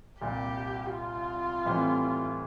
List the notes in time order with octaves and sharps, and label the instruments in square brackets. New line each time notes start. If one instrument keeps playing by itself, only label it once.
[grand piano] C2 A#2 G3 [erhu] G4
[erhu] F4
[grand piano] A2 E3 G3 C4